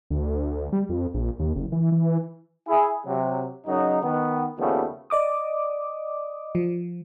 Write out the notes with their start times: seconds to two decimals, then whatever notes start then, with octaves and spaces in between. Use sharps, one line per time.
0.10 D2
0.72 G3
0.89 F2
1.14 A#1
1.39 D#2
1.56 F#1
1.72 E3
1.92 E3
2.68 E4 G#4
3.06 C3 F#3
3.66 F#2 C#3 F#3 D#4
4.02 D#3 B3
4.58 D#2 C#3 F3 G3 A3 B3
5.10 D5 D#5 D6 D#6
6.55 F3